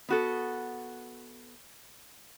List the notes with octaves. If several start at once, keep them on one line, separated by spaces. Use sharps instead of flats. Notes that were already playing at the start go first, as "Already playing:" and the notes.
B3 F#4 A4